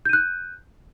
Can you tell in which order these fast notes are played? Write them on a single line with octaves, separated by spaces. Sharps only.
G6 D#7 F#6